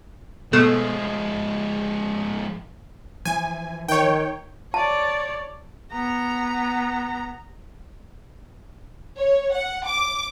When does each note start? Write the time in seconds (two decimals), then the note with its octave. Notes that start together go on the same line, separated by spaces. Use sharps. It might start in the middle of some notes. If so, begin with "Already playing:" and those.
0.53 B2 F3 G#3 A3
3.25 E3 F3 G#5
3.88 D#3 C#5 G5
4.74 C#5 D5 A5
5.92 B3 A#5
9.17 C#5
9.54 F#5
9.87 D6